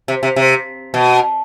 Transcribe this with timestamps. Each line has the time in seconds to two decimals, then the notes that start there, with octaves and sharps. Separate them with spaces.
0.08 C3
0.23 C3
0.36 C3
0.94 B2